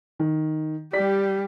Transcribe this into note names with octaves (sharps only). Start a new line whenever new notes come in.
D#3
G3 G4 D5 B6